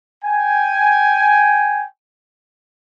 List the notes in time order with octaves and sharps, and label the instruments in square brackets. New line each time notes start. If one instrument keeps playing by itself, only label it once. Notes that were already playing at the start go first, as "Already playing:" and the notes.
[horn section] G5 G#5